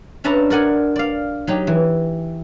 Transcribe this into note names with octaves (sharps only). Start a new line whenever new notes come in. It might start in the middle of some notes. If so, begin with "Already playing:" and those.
C#4 D4 B4 E5 A5 A#5
A#4 D5 F#5 G#5
D5 F5
F#3 D#4 G4
E3